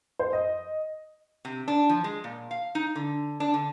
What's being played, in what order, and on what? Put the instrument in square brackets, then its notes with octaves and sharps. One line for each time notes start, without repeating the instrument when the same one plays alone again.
[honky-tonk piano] C5
D#5
[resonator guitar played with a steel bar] C3
D4
F3
G#3
A#2
F5
D#4
D3
D4
D3